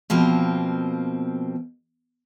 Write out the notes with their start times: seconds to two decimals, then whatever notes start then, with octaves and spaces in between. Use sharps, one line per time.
0.10 B2 F3 A#3 C4